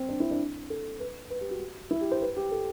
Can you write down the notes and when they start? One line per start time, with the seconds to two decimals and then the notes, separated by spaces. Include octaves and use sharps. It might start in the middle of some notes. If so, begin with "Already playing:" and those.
Already playing: C4
0.09 D4
0.20 E4
0.31 D4
0.70 A4
1.00 B4
1.30 B4
1.41 G4
1.51 F#4
1.91 E4
2.01 G4
2.11 C5
2.22 B4
2.36 G4
2.51 A4